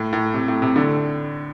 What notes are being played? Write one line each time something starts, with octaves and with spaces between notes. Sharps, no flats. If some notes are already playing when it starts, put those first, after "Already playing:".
Already playing: A2
A2
C3
A2
C3
A2 D3